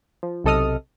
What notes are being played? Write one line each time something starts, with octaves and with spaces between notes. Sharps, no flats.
F3
B1 C3 A4 D#5 D#6 F6